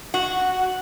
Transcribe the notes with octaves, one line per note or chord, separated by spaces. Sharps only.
F#4